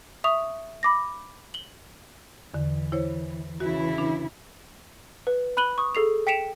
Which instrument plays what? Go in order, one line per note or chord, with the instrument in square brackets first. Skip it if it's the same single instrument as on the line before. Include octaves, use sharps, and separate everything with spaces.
[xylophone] E5 C#6 D#6 F7
B5 D6 A#6
F#7 G7
[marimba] E2 D3 [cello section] E3
[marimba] E4 C5 C#5
[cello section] C#3 E3 E4 [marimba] F#4
[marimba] D4
[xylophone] B4
B5 F#6 D#7 F#7 G7
C#6 D#6
G#4 A4 C7 F7
G5 B6 C#7 D7 E7 F7